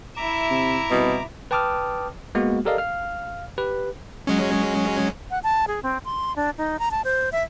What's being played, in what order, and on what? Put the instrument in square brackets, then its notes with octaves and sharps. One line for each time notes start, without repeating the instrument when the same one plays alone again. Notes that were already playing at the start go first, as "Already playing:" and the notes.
[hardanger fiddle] E4 E5 [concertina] A#5 D6
[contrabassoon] C3
[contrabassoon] C2 [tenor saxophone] B2
[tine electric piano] B4 G5 A5 D6 D#6 F6
G#3 A#3 B3 F#4
G4 A4 A#4 D5 D#5 F5
F5 F6
G4 B4
[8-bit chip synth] F#3 G#3 C#4
[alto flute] F#5
A5
G#4
C4
C6
D4
D#4
A#5
A5
C5
E5